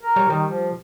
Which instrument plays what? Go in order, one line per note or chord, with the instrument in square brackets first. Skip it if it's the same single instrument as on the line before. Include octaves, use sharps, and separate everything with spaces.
[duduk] A#4
[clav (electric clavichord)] G3 C#5
[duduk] D#3 [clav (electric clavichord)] G3
[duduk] F3